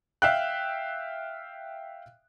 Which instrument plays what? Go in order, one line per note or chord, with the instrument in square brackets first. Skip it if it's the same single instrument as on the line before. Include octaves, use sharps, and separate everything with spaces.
[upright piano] E5 F5 G5 F#6